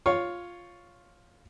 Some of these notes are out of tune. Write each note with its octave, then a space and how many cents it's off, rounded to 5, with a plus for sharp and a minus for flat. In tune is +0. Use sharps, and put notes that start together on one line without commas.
F4 +5 C#5 +0